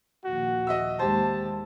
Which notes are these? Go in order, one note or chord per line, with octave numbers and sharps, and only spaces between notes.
A#1 D#2 F#4
D#5 E5 E6
D#2 G#3 G4 C5 A5